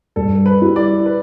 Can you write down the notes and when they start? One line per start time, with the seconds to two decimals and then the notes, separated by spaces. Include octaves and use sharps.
0.16 G2 A4
0.46 B4
0.61 G3 E4 G4
0.76 D5
1.06 B4